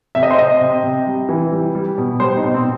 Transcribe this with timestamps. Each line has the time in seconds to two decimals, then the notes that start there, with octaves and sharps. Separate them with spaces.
0.15 C3 E5
0.23 D#5
0.31 C5
0.38 C3 D#5
0.61 C3
0.84 C3
1.07 G3
1.29 E3
1.52 G3
1.75 G3
1.98 B2
2.20 G3 C5
2.37 D#4
2.43 B2
2.54 C4